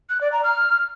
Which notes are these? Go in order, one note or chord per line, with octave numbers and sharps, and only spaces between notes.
F#6
D5
A#5
F6